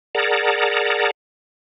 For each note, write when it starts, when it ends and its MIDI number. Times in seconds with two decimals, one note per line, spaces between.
0.15 1.11 68
0.15 1.11 70
0.15 1.11 74
0.15 1.11 78
0.15 1.11 81
0.15 1.11 82